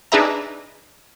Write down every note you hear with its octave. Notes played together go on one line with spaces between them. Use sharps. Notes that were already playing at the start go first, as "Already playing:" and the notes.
D4 D#4 G#4 B4 E5 A#5